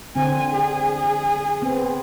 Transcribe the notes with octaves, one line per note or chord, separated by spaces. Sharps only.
D3 C4 G#5
G#4
B3 C4